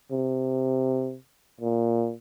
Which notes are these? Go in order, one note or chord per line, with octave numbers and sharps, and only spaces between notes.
C3
A#2